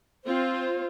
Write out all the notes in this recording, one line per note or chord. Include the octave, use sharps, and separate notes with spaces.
C4 F4 C5